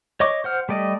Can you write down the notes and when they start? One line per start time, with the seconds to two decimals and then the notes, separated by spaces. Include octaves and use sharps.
0.20 C#5 D#5 C#6 D6
0.44 C5 F#5 F6
0.69 G3 A3 D5 D#5